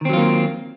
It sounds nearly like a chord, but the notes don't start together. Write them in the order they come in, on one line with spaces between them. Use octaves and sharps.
D#3 C4 F#3 F4 A#3